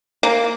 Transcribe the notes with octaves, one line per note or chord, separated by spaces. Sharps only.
A#3